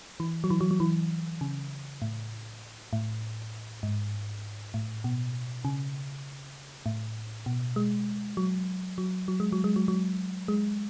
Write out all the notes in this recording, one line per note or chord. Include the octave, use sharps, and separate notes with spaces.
E3
F#3
E3
F#3
F#3
E3
C#3
A2
A2
G#2
A2
B2
C#3
A2
B2
G#3
F#3
F#3
F#3
G#3
F#3
G#3
F#3
F#3
G#3